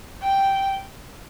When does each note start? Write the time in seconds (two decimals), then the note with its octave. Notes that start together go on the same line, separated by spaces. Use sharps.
0.22 G5